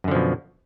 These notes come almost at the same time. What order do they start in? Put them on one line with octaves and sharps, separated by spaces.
F#2 D3 F3 B2